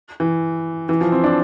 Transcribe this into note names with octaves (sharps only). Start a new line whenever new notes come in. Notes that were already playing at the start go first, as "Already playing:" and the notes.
E3
E3
F3
C4
D4